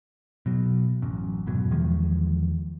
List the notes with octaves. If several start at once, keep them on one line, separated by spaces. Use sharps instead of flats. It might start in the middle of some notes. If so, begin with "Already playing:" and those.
B2 F#3
A1 F#2
F1 G#2 B2 F#3
E2 D#3 F3 G#3